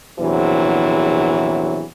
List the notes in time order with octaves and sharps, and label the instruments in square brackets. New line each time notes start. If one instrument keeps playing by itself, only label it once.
[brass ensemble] A#1 E2 C3 E3 F#3